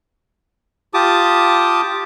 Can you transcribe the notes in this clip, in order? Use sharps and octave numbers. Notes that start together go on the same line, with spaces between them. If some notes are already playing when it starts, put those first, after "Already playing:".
F4 G4 A5 D6 D#6